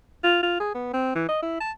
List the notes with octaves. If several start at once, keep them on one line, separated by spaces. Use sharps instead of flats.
F4
F4
G#4
B3
C4
E3
D#5
E4
A5